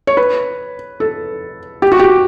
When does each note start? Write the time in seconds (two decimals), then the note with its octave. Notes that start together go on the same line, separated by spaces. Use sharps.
0.07 C#5
0.17 B4
1.00 A4
1.82 G4
1.92 F#4
1.99 G4